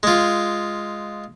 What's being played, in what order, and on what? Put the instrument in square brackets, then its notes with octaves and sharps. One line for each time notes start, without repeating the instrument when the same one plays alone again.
[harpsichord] G#3 F4